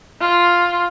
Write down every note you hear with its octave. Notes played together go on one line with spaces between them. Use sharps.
F4